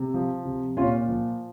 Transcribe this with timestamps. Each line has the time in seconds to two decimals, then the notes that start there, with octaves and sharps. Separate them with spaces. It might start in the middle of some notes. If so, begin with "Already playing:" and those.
Already playing: C3
0.14 F3
0.45 C3
0.77 A#2 C#4 F4
1.08 F3